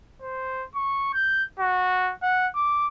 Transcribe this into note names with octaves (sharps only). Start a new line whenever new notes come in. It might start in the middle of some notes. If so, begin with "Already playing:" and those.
C5
C#6
G6
F#4
F#5
D6